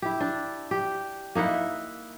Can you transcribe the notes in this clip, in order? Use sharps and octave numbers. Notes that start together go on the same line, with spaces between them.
E4 G4
D4
G4
A#3 D#4 E4 F#5